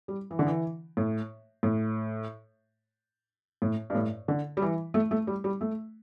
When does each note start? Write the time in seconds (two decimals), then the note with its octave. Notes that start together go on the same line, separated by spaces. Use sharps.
0.08 G3
0.31 E3
0.39 D3
0.46 E3
0.97 A2
1.63 A2
3.62 A2
3.90 G2
3.95 A2
4.28 D3
4.57 G3
4.62 E3
4.94 A3
5.11 A3
5.27 G3
5.44 G3
5.61 A3